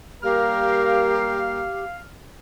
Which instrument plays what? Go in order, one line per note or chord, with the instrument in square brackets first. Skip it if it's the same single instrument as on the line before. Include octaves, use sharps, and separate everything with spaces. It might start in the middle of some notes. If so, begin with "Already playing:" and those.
[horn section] G3 A#3 A#4 [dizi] G4 [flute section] F5 [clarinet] F6